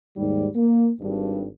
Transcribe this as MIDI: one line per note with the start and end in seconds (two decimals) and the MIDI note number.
0.16 0.48 39
0.16 0.48 44
0.16 0.48 55
0.56 0.89 58
1.01 1.48 32
1.01 1.48 43